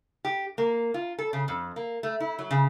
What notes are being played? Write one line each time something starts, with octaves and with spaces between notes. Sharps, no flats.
G4
A#3
F4
A4
C#3
F2
A#3
A3
E4
F#3
C#3